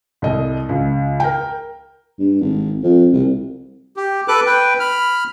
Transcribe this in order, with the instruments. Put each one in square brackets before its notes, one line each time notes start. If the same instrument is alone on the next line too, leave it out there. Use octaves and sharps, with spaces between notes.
[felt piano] C2 A4 D#5
C#2
A#4 G5
[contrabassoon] G2
G#1
F2
C2
[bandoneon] G4
A4 B4 D6 F#6
B4 G5
B5 F6